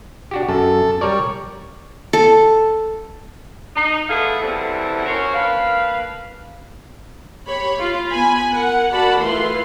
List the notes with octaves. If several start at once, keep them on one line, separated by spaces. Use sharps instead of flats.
D4 F#4 G4
F#2 A4
G3 A#4 C#5 D5
A4
D#4
A3 B3 E4 G#4 A4 F5
E2 D3 E3 G3 C4 E4
C#4 F#4 A#4 C5 C#5
A#3 D4 B4 F5
G4 C#5 B5
F4
B3 G#5 B5
A#4 F#5
F#4 A#4 D5 F#5 A5 B5
E3 A3 E4 F4 B4 C6